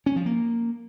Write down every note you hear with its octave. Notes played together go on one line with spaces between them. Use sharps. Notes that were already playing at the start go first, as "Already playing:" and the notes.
C#4
F3
A#3